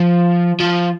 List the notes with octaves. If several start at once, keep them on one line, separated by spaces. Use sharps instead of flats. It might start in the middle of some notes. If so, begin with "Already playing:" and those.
Already playing: F3
F3